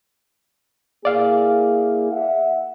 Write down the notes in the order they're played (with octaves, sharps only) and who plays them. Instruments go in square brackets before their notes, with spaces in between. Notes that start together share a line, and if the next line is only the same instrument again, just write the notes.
[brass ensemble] A#3 E4 G#4 [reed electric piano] D5 F5
[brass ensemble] E5 F#5